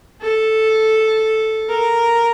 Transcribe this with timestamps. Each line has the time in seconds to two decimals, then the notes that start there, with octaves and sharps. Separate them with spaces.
0.21 A4
1.69 A#4